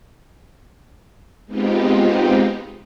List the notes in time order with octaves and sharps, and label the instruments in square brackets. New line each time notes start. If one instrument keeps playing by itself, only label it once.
[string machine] G#3 B3 C4 D#4 F4 G4